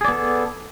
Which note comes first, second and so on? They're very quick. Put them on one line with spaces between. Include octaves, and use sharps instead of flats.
G#4 D5 B3 A4